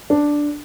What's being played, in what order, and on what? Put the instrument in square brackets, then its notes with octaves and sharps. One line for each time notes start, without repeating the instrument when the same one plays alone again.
[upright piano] D4